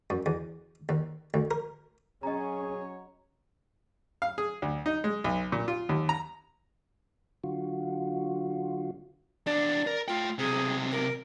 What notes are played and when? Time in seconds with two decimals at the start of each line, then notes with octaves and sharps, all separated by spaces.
0.10 F#2
0.26 E2
0.89 D#2
1.34 D2
1.51 A#4
2.23 F#3 C#4 G#4 C#5 D#5 A#5
4.22 F5
4.38 G#4
4.62 D2
4.86 D#4
5.04 G#3
5.24 B1
5.52 A#2
5.68 F4
5.89 D#2
6.09 A#5
7.44 D3 F#3 F4 F#4
9.46 E2 D4 D5
9.87 A#4
10.08 A3 F4 G5
10.38 B1 C3 G#4
10.92 A#4